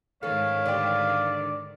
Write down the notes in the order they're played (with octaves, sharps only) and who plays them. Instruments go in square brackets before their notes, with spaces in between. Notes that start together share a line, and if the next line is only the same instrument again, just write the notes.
[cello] G#2 D#3 [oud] C#4 A4 [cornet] C#5 [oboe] F5
[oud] D3 D4 G4 [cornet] D5